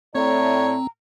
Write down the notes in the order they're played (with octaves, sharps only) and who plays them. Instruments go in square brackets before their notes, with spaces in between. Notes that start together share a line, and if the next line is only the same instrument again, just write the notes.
[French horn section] A2 D5 [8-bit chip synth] C4 [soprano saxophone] C#5 [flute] A#5